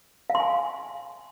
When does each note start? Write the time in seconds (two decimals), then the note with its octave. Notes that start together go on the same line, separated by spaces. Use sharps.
0.30 F5
0.35 C6
0.40 G#5